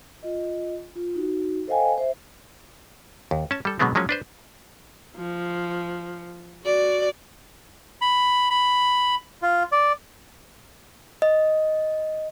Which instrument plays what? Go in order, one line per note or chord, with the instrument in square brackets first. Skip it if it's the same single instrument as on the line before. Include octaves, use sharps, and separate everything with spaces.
[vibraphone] F4 D#5
F4
D#4 F#4
A4 C5 D#5 F5 G5 G#5
C5 E5
[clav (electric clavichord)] D#2
C#4 A5
G3 A4
B2 D3 F#3 G#3 B3 C4
F3 F#3 G#3 A#3 C#4
D4 B4 C5
[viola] F3
F#4 D5
[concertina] B5
B5
F4
D5
[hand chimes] D#5